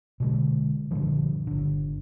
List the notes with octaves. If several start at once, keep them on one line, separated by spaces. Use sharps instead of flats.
B2 D3 G#3
G2 A#2 D3 F3
G1 D3